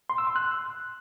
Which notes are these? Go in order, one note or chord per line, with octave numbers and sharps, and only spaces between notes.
C6
E6
C6
F#6